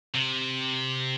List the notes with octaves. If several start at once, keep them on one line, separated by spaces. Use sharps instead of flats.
C3